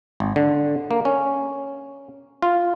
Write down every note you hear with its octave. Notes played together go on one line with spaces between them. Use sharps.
G#1
D3
A#3
C#4
F4